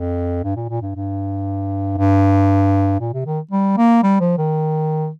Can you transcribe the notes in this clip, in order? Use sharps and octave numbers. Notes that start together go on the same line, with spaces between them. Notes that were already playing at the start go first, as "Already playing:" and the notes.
Already playing: F2
G2
A#2
A#2
G2
G2
G2
A#2
C3
D#3
G3
A#3
G3
F3
D#3